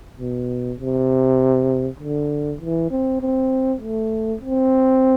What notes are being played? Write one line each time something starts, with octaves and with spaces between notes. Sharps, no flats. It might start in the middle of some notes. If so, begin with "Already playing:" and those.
B2
C3
D3
E3
C4
C4
A3
C4